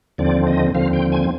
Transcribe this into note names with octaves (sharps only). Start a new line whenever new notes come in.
D#2 D3 F3 C4 D5
D#5
D#2 D3 F3 C4 F5
G5
G#5